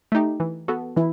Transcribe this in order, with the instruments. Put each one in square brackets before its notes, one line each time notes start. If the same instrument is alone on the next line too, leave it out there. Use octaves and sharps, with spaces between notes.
[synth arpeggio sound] A3 D#4 G4
E3
B3 F#4 A4
[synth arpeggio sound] E3 [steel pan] E4